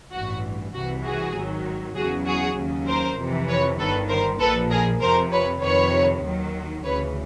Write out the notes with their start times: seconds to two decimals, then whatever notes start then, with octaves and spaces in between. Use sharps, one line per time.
0.12 A1 G2 E3 F#4
0.74 C2 C3 E3 F#4
1.05 F#4 G#4
1.35 G#1 G#2 D#3 F#3
1.96 E2 C#3 F#3 F#4 G#4
2.26 F#4 G#4
2.57 D#2 C#3 F#3
2.87 A#4 C5
3.18 F2 C3 E3
3.48 B4 C#5
3.79 G1 G2 D#3 A4 B4
4.09 A#4 C5
4.40 A#1 A#2 F3 A4 B4
4.70 G#4 A#4
5.01 F2 C3 F3 A#4 C5
5.32 B4 C#5
5.62 F2 C3 D#3 B4 C#5
6.23 D#2 D#3 F#3
6.84 D2 C#3 E3 B4 C#5